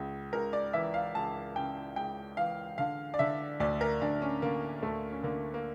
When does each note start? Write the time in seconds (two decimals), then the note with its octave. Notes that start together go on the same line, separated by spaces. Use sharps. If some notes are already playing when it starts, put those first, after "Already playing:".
Already playing: C#2 C#3
0.33 C#2 A#4
0.53 D5
0.73 E3 E5
0.94 F5
1.15 C#2 A5
1.56 C#3 G5
1.96 C#2 G5
2.37 E3 F5
2.78 D3 F5
3.14 D5
3.19 D3 E5
3.60 D2 D5
3.81 A#4
4.01 D2 D4
4.22 C#4
4.42 D3 A#3
4.82 D2 A3
5.12 C#4
5.23 D3 A#3
5.54 A#3